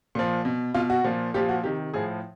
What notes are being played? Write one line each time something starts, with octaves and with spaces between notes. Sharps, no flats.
A#2 F3
B2
B2 F4
F#4
A#2 F3
A#2 F3 G4
F#4
C3 D#3 G4
A2 F3 G#4